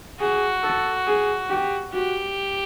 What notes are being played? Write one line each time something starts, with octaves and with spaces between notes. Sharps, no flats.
F#4 G#4
A4
G#4
G4
F#4 G4